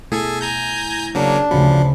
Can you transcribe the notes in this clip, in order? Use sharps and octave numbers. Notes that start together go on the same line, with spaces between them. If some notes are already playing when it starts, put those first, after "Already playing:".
B2 A3 E4 G#4 A4 G#6
G#5 A#5 G6
C#3 F#3 A#3 D4
D2 C#3 F3 F#4 B5